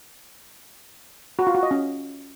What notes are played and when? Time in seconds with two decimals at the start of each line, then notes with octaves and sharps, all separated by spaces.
1.39 F#4
1.47 F4
1.55 F#4
1.63 D#5
1.71 C#4